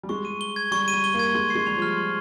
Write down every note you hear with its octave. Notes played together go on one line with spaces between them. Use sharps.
G3
G#3 C#6
D#7
G7
G#6
G3 C#6
D#7
G3
G7
A#3
G#6
G#3 C6
C7
G#3
G3 F7
F3
F6
C6